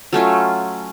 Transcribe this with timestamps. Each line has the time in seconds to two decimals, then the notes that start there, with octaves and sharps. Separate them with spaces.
0.13 F#3 A3 C#4 F4